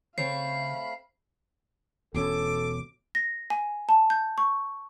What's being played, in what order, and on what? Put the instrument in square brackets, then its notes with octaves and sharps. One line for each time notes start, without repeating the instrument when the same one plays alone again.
[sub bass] C#3 [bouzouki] A3 C4 C#5 [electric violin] F5 B5 [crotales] C7
[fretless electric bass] E1 B2 C#4 [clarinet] A4 [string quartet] D6
[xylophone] A#6
G#5
A5
G6
C#6